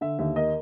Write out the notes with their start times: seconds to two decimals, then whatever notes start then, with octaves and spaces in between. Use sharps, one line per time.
0.01 D3 E5
0.19 D#2 E5
0.36 A#3 D#5